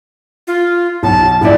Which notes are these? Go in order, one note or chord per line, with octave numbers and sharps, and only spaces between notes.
F4
B1 A5
A#1 E4 D5